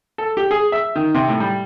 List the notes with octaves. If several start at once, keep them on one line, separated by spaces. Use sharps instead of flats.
A4
G4
G#4
E5
D#3
C3
A2
G3